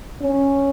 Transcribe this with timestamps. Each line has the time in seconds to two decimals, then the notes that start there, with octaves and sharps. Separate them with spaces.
0.22 C#4